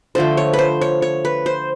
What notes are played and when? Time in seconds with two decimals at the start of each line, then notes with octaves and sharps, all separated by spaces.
0.15 D3 F3 A3 C5
0.37 C#5
0.53 B4
0.59 C5
0.81 C#5
1.02 C#5
1.25 B4
1.46 C5